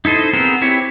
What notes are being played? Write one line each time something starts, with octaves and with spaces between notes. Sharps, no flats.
D#4 E4 A4 C5 D#5
B3 C4 G#4 A#4 C5
C4 E4 G4 C#5